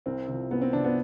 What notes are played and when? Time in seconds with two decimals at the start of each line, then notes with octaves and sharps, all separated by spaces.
0.06 C2 C4
0.28 C3 F3
0.50 C2 B3
0.62 C4
0.73 C3 D4
0.76 F3
0.84 B3